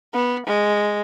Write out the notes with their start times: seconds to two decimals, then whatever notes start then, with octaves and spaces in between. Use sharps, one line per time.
0.13 B3
0.46 G#3